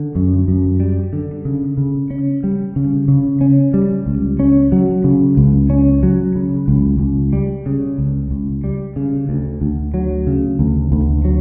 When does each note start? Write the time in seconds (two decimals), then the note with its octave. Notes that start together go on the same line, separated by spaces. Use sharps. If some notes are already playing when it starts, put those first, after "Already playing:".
Already playing: D3
0.15 F#2
0.48 F#2
0.80 G3
1.13 D3
1.45 C#3
1.77 C#3
2.11 C#4
2.44 G3
2.76 C#3
3.08 C#3
3.41 C#4
3.74 G3
4.06 C#2
4.40 C#4
4.72 F#3
5.04 C#3
5.37 C#2
5.70 C#4
6.03 F#3
6.36 C#3
6.68 C#2
7.00 C#2
7.33 G3
7.66 C#3
7.98 C#2
8.31 C#2
8.64 G3
8.96 C#3
9.29 D2
9.61 D2
9.94 F#3
10.27 C#3
10.59 D2
10.92 D2
11.25 F#3